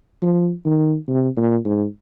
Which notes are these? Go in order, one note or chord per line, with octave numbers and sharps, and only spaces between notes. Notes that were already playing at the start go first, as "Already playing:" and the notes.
F3
D#3
C3
A#2
G#2